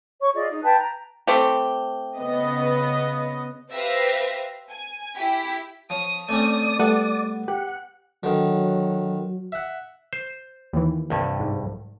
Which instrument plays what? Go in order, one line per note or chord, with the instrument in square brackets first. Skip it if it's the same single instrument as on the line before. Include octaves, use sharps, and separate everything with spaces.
[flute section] C#5 C#6
F4 G#4 D5 D#5
D#4
B4 G5 A5 F#6
A#5
[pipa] A3 C4 G4
[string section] C#3 B3 D#5
[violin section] G4 B4 C5 E5 F5 A#6
G#5
E4 G4 B6
[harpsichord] F3 C#5 [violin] D#6 D#7
[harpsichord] A3 C4 C#4 [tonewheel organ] D5
[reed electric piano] G3 A3 F#5 [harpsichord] B3
[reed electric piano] G4 [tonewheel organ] F#5
[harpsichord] D3 D#3 [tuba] F#3
[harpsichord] E5 F#5
[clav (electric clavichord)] C5
[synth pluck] D#2 E3
[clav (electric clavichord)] C2 G2
[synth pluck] G#2